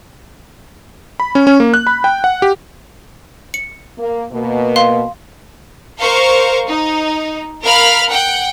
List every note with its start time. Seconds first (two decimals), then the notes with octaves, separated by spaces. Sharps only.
1.20 B5
1.35 C#4
1.47 C#4
1.60 A#3
1.74 F#6
1.87 B5
2.04 G5
2.24 F#5
2.42 G4
3.54 C#7
3.98 A#3
4.31 B2 A#3
4.76 F5 C6
6.00 A#4 C5 F5 C#6
6.67 D#4
7.62 A#4 F5 B5 F6
8.08 F#5 G5